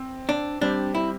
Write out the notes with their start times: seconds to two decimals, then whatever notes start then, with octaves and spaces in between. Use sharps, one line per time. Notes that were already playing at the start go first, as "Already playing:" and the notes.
Already playing: C4
0.29 D4
0.61 G3 C4 D4 G4
0.95 E4